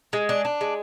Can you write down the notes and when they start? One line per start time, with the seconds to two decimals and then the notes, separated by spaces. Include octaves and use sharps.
0.13 G#3
0.29 D4
0.45 D4
0.61 G#3